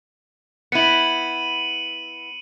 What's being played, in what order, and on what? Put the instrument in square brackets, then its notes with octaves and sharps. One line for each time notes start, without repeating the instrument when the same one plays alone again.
[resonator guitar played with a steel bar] B3 E4 [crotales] C#7 D#7 F#7